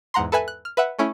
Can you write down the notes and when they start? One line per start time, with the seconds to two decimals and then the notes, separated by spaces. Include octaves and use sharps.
0.14 E2 G#2 F#5 A#5 C6
0.32 A4 B4 E5 G#5 F#6
0.48 F#6
0.65 F6
0.77 B4 E5 F#5
0.99 A3 C#4 E4